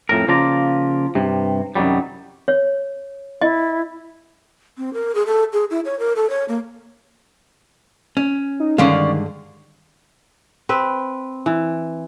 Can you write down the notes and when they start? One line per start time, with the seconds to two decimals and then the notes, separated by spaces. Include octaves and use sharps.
0.09 F2 A2 A#4
0.28 C#3 F3 A#3 F4 D5 A#5
1.15 G2 C3
1.75 C2 F#2 D#3 F#3 G3
2.48 C#5
3.41 E4 D#5
4.78 C4
4.93 A#4
5.15 G#4
5.27 A4
5.53 G#4
5.70 E4
5.85 C#5
5.99 A#4
6.16 A4
6.30 C#5
6.48 A#3
8.17 C#4
8.60 D#4
8.78 G2 D3 D#3 G#3 C#4 D5 F5
10.69 C4 B4
11.46 E3